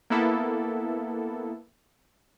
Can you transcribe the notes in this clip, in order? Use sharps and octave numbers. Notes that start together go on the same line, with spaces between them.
A#3 B3 E4 A4